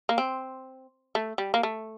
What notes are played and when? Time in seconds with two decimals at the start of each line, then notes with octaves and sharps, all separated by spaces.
0.09 A#3
0.18 C4
1.15 A3
1.38 G3
1.54 A#3
1.63 A3